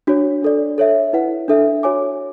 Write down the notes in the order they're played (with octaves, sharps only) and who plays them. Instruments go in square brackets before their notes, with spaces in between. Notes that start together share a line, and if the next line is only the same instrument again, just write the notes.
[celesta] D4 F#4 C#5
D4 A4 D5
A4 C#5 E5
E4 B4 F#5
D4 A4 E5
F#4 C#5 G#5 D6